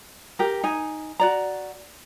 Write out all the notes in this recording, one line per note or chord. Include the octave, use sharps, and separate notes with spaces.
G4 A#4
D#4 G#5
F#4 D5 A#5